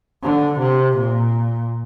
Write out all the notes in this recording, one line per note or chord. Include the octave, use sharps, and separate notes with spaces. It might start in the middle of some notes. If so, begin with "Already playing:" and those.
D3
C3
A#2